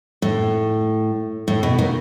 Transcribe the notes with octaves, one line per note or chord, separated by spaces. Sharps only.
A2
A2
B2
D#3